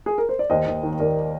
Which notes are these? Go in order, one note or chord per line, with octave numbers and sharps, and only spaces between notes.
G#4
A#4
C5
D5
D#2 C5 D#5
D#2
D#3
D#2 A#4 D5